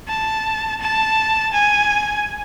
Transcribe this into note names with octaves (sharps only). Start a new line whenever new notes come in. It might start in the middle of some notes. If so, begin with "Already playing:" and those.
A5
A5
G#5